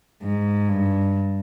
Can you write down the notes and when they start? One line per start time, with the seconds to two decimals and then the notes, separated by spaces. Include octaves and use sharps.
0.23 G#2
0.69 G2